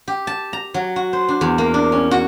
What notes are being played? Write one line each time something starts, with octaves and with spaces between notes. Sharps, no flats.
G4
A5
A#5
F#3
F#4
C5
D4
E2
A#3
D4
C#4
F#4